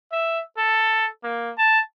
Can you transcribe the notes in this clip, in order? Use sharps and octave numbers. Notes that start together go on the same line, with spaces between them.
E5
A4
A#3
A5